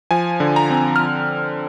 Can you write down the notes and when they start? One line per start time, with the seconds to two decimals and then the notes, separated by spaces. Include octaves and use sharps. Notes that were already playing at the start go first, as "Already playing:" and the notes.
0.11 F3 G#5
0.40 D3
0.56 A#5
0.70 C4
0.96 F6